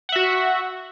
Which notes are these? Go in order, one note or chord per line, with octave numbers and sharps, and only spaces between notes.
F#4 E5 F#5